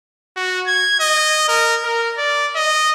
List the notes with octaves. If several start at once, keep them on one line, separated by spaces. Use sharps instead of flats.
F#4
G#6
D#5
A#4
A#4
D5
D#5